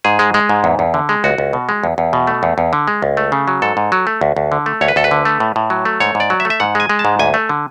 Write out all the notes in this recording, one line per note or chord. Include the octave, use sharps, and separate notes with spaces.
G#2 G#4
G#3
G#3
G#2
E2
E2
D3
G#3
C#2 F#4
C#2
B2
G#3
E2
E2
B2
A3
E2
E2
D3
G#3
C#2
A3
C#3
F#3
G#2 A4
G#2
F#3
A3
D2
D2
D3
A3
D2 C#5
B4
D2 A4
B4
D3
A3
A2
A2
F#3
A3
G#2 C#5
G#2
D5
F#3
E5
A3
E5
G#2 F#5
G#3 G#5
G#3
A5
G#2
D2 G#5
A3
D3